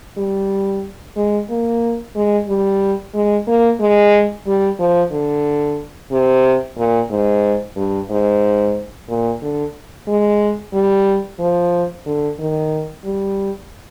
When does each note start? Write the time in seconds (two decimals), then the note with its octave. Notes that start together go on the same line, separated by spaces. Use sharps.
0.18 G3
1.17 G#3
1.50 A#3
2.15 G#3
2.48 G3
3.14 G#3
3.47 A#3
3.80 G#3
4.46 G3
4.79 F3
5.12 D3
6.11 C3
6.77 A#2
7.10 G#2
7.77 G2
8.10 G#2
9.09 A#2
9.42 D3
10.08 G#3
10.73 G3
11.39 F3
12.06 D3
12.39 D#3
13.05 G3